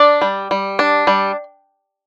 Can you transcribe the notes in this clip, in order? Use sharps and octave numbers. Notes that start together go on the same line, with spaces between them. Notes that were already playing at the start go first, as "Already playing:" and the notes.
Already playing: D4 D5
G3
G3
D4
G3